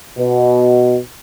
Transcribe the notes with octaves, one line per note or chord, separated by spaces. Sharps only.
B2